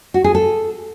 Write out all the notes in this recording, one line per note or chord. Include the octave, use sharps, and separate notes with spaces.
F#4
G#4
A4